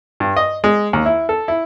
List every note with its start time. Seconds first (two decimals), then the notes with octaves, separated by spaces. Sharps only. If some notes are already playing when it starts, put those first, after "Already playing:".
0.20 G2
0.37 D#5
0.64 G#3
0.93 D#2
1.06 E4
1.29 A4
1.48 E4